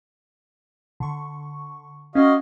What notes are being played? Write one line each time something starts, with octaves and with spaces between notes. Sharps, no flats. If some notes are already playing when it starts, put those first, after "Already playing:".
D3 C#6
C#4 F#4 D#5 F5